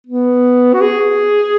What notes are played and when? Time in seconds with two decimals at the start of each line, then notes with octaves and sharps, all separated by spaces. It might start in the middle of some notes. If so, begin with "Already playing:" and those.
0.07 B3
0.74 F#4
0.81 G#4